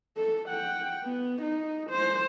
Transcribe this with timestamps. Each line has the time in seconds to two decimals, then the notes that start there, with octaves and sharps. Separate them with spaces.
0.17 A4
0.49 F#5 G5
1.04 B3
1.42 D#4
1.90 C5